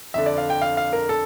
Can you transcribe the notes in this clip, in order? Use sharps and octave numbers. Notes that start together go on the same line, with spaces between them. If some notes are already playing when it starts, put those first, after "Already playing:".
F2 D3 E5
D5
F5
G5
F5
F5
A#4
A4